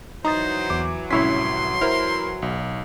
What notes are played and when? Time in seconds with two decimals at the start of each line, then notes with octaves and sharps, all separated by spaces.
0.25 E3 F#3 D#4 C5 A#5 D#6 A6
0.70 E2 D6
1.11 C2 A2 C#4 E4 C#5 C6 B6
1.81 E4 A#4 C5 F6
2.42 B1